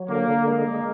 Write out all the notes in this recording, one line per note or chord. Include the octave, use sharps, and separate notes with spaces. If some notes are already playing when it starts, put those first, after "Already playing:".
Already playing: F#3
D3 A#3
D3
G#3 A#3
G#3